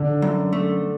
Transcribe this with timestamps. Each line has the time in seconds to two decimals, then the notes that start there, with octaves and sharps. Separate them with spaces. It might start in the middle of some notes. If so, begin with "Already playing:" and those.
Already playing: D3
0.22 F#2
0.53 A3